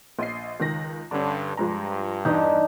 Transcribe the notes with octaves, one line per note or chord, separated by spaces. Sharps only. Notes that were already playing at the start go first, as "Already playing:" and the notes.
A#1 D#5 C7
C#2 D#3 A#6
G2 D3 C#4 D4
G2 F3 G#3 A#5
E2 D4 D#4